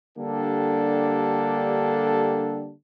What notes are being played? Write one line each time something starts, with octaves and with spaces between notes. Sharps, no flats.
D3 G3 A#3 D4 G4 A4